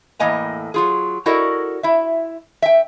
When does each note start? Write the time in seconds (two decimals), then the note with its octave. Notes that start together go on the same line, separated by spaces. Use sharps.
0.19 E2 A2 A#3 D#5 G#5 A#5
0.74 F#3 F4 G#4
1.26 E4 F#4 A4 A#4 D5 D#5
1.83 E4 E5
2.62 E5 G5